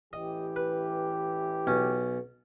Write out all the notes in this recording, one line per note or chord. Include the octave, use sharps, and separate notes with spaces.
A1 E3 G4 D#5
B4
B1 C#4